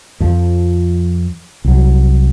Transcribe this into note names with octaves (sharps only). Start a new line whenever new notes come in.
F2 F3
C2 F#3